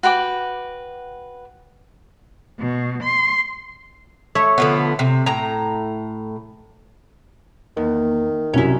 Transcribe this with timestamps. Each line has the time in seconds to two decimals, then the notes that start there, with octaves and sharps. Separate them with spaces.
0.03 F#4 B4 G5 D6
2.58 B2
3.02 C6
4.35 A3 C#5 E5
4.58 D3 F3 B3
4.99 C3
5.26 A2 A#5
7.77 E2 D#3 A#3
8.54 C2 F#2 C#4 E4 F#4